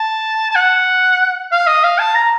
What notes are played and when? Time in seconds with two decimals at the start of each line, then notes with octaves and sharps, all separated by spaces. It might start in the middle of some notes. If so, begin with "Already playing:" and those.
Already playing: A5
0.51 A5
0.55 F#5
1.52 F5
1.67 D#5
1.84 F5
1.99 A5
2.15 A#5